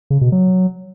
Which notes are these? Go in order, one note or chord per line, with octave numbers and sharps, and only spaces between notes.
C#3
B2
F#3